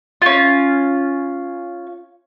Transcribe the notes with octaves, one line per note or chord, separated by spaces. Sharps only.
C#4 F4